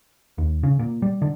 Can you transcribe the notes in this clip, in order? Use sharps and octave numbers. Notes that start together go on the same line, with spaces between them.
D#2
C#3
A#2
G3
D3